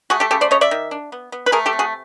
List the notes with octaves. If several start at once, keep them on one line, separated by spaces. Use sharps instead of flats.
A3 F#4 G#4
G4 A4
C#3 G4 A4
C5 D5
C#3 C#5 D#5
D5 E5
D#3
D4
B3
B3
B4
A3 G#4 A#4
G4 A4
C3
F#4 G#4